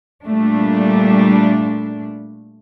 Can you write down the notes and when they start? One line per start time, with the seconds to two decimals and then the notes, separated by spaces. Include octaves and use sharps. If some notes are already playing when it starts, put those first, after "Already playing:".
0.24 A#2 G3 A3 D4